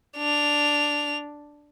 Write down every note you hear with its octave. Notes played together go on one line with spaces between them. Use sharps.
D4 F7